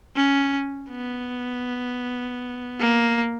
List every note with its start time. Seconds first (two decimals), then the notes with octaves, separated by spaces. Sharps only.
0.16 C#4
0.91 B3
2.80 A#3